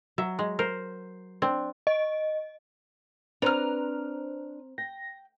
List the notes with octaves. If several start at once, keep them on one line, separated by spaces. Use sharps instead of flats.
F#3 E5
G#3
A#4 C5
C4 D4
D#5
C4 D4 B4 C5 A#5 F6
G5 A#6